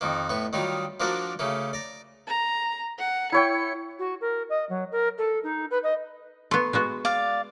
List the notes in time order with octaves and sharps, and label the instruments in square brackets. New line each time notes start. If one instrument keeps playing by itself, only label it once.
[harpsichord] F2 D#3 A#3
A2 B3 C#6
D#3 F#3 G3 D#4 F4
F3 A#3 D4 F#4 A#4 D5
C#3 A3 A#3
D5 A#5
[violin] A#5
F#5
[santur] E4 C#5 G5 [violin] C#7
[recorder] F#4
A#4
D#5
F#3
A#4
A4
D#4
B4
D#5
[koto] A3 B3 [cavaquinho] C6
[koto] G#3 B3 F#4
[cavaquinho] D5 F5